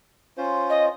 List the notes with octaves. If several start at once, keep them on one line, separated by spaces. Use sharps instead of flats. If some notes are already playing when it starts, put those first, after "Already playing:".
C#4 F4 C5
D#5